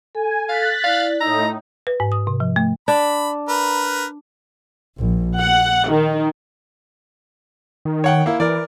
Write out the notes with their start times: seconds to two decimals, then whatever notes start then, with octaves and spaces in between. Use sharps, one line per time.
0.15 A4 G#5
0.49 F5 F#6 A6 B6
0.84 E4 D5 F5
1.21 A2 D#4 A#5 E6
1.87 B4
2.00 G#2
2.12 D#6
2.27 C3
2.40 F3
2.56 A3
2.88 D4 B5
3.49 A#4 B4
4.98 A#1
5.39 F#5
5.90 D#3
7.85 D#3
8.04 C#5 F#5 G5
8.26 A#3 E4
8.40 E3 A#4 D5